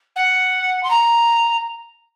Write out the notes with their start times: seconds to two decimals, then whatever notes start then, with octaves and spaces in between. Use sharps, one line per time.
0.16 F#5
0.83 C6
0.90 A#5